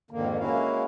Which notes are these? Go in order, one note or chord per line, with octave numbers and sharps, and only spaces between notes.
F2 G#2 D3 D#3 A#3
G#3 A#3 C#4 E4 F#4 F5